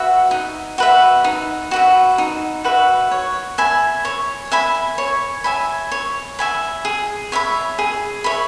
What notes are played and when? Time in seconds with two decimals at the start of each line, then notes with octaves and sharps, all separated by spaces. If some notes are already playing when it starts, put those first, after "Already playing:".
Already playing: F#4 B4 E5
0.31 D#4
0.78 F#4 B4 E5
1.24 D#4
1.71 F#4 B4 E5
2.18 D#4
2.64 F#4 B4 E5
3.11 C#5
3.58 E5 G#5 B5
4.05 C#5
4.52 E5 G#5 B5
4.98 C#5
5.44 E5 G#5 B5
5.92 C#5
6.39 E5 G#5 B5
6.85 G#4
7.32 C#5 E5 B5
7.79 G#4
8.24 C#5 E5 B5